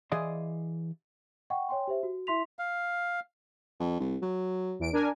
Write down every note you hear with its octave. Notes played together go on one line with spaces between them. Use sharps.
E3 G#4 D5 D#5 F5 C6
D#5 F#5 G5 C#6
C#5 D#5 G5 G#5 C6
G4 C5 E5
F#4
E4 E5 C6 B6 F7
F5
F2
C2
F#3
E2 D7
D4 A#4 G#5